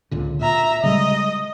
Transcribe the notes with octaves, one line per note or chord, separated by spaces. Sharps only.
C#2 A#2 D3
A#2 E5 A#5
C#3 G3 G#3 D#5